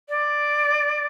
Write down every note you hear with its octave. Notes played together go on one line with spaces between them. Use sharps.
D5